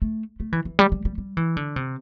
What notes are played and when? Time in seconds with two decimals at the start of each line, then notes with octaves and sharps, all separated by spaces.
0.02 A3
0.40 A3
0.52 E3
0.65 E3
0.79 G3
0.92 G3
1.05 G3
1.18 G3
1.37 E3
1.57 D3
1.76 C3